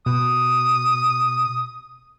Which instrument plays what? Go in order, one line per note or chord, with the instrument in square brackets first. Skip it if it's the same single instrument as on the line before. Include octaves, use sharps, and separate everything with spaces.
[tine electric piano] B2 [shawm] D#6